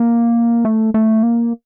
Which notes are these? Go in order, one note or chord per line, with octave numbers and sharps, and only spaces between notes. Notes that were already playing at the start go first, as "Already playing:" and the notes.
Already playing: A#3
A3
A3
A#3